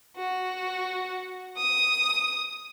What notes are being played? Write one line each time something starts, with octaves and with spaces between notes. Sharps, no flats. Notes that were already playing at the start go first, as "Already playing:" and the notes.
F#4
D#6